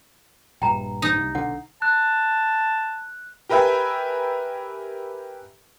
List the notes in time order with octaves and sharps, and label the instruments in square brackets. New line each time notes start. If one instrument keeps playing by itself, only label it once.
[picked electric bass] A#1 G2 [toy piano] G5 A#5
[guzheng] D#4
[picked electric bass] C2
[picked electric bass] B1 D3 [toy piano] F#5
[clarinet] A5 [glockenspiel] F#6
[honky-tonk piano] G4 A#4 B4 E5 G5 G#5